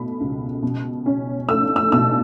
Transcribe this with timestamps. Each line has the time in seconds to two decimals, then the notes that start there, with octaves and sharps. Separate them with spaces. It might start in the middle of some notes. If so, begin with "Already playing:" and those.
Already playing: B2 A3 B5
0.20 C#2
0.62 B2
1.06 C#4
1.49 A3 E6
1.76 E6
1.92 B2 E6